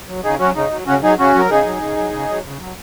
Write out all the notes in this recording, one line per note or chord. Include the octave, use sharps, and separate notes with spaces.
F#3
C#3 D#4 G#4
F#3 C#4 F#4
C#3 D#4
F#3
C#3 C#4 F#4
F#3 D#4 G#4
C#3 C#4 F#4
F#3 A#4
C#3 D#4 G#4
F#3
C#3
F#3
C#3
F#3
C#3
F#3